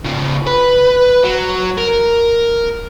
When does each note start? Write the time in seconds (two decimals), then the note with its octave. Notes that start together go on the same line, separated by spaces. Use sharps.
0.05 C#3 F3
0.47 B4
1.24 F#3
1.77 A#4